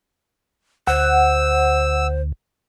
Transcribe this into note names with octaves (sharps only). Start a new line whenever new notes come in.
D2 C5 F#5 E6